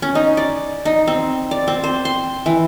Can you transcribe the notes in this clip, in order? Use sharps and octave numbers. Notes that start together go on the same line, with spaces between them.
C#4
D#4
D5
D#4
C4
D5
C4
C5
C6
E3